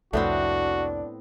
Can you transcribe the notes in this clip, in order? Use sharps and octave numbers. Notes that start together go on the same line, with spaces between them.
C2 F2 A2 B3 C4 D4 F#4